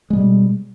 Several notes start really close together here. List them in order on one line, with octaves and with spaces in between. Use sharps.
G#3 G3 B2